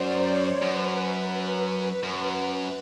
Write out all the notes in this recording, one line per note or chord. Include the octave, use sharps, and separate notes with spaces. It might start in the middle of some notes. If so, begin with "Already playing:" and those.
Already playing: F#2 C5 D5
C#5
F#2 B4
F#2